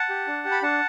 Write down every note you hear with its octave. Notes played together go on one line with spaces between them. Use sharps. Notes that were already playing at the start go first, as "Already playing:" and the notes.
Already playing: F#5 A5
G4
D4
G4
B5
D4 F#5 A5